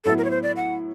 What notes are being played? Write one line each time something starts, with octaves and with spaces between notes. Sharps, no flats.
A2 F#3 B3 E4 A4
A#4
C#5
C5
D5
F#5